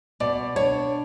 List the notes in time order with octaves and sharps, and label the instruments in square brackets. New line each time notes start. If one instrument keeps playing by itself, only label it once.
[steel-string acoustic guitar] B2 [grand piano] D5
[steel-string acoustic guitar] D4 [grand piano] C#5